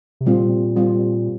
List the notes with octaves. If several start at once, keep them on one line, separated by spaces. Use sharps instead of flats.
C3
A#2 G3 C4 F4
G3 C4 F4